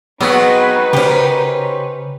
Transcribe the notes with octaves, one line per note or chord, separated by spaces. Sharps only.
F#3 G#3 B3 C4 D#4 F#4 B4 D#5
C#3 C#4 G4 A#4 C5